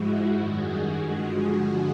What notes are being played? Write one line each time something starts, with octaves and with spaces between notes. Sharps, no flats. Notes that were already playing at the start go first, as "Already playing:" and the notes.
Already playing: G#2 F3 G#3 E4 F#4
F#2 D#3 G3 F#4 G#4
G2 D3 F3 G#3